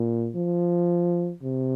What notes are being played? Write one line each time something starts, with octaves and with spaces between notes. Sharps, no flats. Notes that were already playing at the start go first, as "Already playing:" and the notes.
Already playing: A#2
F3
C3